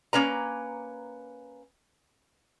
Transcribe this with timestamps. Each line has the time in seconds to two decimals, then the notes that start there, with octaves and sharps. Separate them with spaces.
0.13 A#3 C#4 B4 A#5